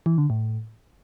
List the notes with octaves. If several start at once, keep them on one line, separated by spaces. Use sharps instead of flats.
E3
D3
A2